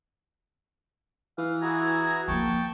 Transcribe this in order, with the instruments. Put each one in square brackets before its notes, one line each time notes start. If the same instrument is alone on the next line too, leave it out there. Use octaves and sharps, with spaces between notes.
[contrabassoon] E3 [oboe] F5
[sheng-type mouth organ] E4 F#4 A#5 [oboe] G#4
[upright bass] F3 A#3 [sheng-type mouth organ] G5 A5 [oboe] C#6